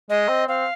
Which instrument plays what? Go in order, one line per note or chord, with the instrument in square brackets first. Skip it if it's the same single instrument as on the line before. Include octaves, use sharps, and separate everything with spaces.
[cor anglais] G#3 [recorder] D#5
[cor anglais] C4
[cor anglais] C4 [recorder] F5